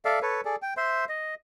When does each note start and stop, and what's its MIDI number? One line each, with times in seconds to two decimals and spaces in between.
0.05 0.19 69
0.05 0.19 74
0.05 0.19 76
0.05 0.19 77
0.22 0.41 69
0.22 0.41 71
0.22 0.41 73
0.45 0.56 68
0.45 0.56 69
0.45 0.56 74
0.62 0.74 79
0.77 1.05 72
0.77 1.05 76
0.77 1.05 84
1.09 1.35 75